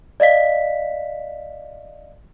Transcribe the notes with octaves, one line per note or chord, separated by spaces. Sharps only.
D5 D#5 F5 B6